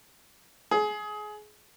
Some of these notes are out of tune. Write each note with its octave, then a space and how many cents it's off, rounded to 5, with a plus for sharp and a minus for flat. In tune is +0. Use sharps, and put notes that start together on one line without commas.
G#4 +25